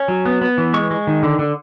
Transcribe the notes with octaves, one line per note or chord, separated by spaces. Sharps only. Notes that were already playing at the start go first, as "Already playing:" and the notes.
Already playing: C#4
F#3
B3
B3
E3
G#3 C#6
G#3
D#3
D3
D3